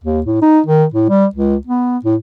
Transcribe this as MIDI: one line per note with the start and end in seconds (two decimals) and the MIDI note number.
0.04 0.20 39
0.26 0.38 45
0.42 0.60 63
0.66 0.85 51
0.94 1.07 45
1.09 1.26 55
1.35 1.56 37
1.67 1.98 59
2.05 2.15 45